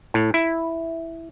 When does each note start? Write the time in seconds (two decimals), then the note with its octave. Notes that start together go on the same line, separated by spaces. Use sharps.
0.14 A2
0.34 E4